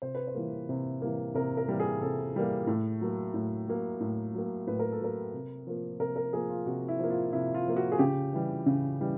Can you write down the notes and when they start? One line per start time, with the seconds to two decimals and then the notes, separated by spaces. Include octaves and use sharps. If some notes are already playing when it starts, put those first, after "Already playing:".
0.02 C3 C5
0.15 B4
0.27 C5
0.35 E3 G3 A#3
0.69 C3
1.02 E3 G3 A#3
1.34 C3 A#4
1.57 A#4
1.68 E3 G3 A#3
1.80 G#4
2.01 C3 A4
2.34 E3 G3 A#3
2.67 A2
3.01 F#3 A#3
3.34 A2
3.68 F#3 A#3
4.00 A2
4.34 F#3 A#3
4.67 A2 B4
4.79 A#4
4.92 A4
5.01 F#3 A#3 A#4
5.34 C3
5.67 F3 A#3
6.00 C3 A#4
6.16 A#4
6.33 F3 A#3 G#4
6.49 F4
6.66 C3 F#4
6.88 E4
6.99 F3 A#3
7.10 F4
7.33 C3 E4
7.54 F4
7.67 F3 A#3
7.76 F#4
7.92 G#4
7.99 C#3 G4
8.33 E3 G3
8.66 C#3
8.99 E3 G3